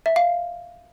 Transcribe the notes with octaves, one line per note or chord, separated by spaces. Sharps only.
E5
F5